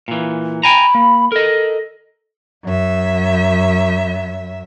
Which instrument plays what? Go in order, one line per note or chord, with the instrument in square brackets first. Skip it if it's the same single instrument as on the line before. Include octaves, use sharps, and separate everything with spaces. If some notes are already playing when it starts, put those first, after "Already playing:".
[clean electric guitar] A#2 E3
[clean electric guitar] G5 G#5 A#5 [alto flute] B5
[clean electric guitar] A#3
[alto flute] A4 [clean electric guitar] A#4 D#5
[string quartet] F#2 E5